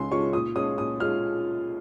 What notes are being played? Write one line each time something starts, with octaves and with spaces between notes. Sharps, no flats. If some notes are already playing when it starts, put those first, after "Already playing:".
Already playing: C#2 C#3 G#3 C#4 F4 G#5 C6
C#3 G#3 C#4 F4 C#6
A#2 D#6
G#3 C#4 F4 D#6
A#2 D#6
G#3 C#4 F4 F6